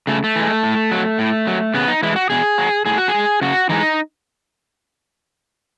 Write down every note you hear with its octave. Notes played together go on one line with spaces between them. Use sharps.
C#3 A3
A3
E3 G#3
A2
F#3
A2
F#3
C#3 B3
D#4
E3 G#3 E4
F#4
B2 G#4
F#3
A2 G#4
F#4
G#4
G#3
C#3 F#4
E3 G#3 D#4